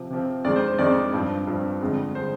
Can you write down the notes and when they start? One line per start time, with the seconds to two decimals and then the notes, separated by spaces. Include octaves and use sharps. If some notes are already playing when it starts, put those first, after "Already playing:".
Already playing: C3 F3 C4
0.10 C3 F3 C4
0.45 F2 D#3 G#3 C4 D5
0.56 C5
0.68 C5
0.78 F2 D#3 G#3 C4 D5
1.13 G2 F3 C4
1.47 G2 F3 C4
1.81 F2 D3 G#3
2.15 D3 G#3 C5